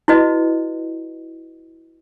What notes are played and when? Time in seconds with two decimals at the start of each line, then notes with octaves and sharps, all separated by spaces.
0.08 E4 F#4 B4 D#5